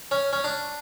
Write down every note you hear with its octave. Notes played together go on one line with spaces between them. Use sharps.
C#4
C#4
D4